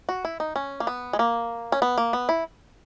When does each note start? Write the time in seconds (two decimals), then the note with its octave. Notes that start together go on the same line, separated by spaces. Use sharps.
0.09 F#4
0.25 E4
0.40 D#4
0.56 C#4
0.80 A#3
0.87 B3
1.13 G#3
1.19 A#3
1.72 C#4
1.82 B3
1.98 A#3
2.13 B3
2.29 E4